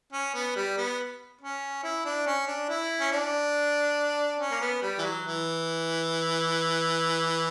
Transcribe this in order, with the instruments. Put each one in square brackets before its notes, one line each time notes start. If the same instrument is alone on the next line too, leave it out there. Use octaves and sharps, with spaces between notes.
[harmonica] C#4
B3
G3
B3
C#4
E4
D4
C#4
D4
E4
C#4
D4
C#4
A#3
B3
G3
E3
F#3
E3